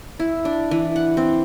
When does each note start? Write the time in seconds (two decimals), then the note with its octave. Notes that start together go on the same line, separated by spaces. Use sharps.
0.20 E4
0.45 D4
0.71 E3
0.96 F#5
1.17 C4